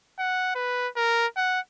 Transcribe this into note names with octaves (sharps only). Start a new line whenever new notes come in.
F#5
B4
A#4
F#5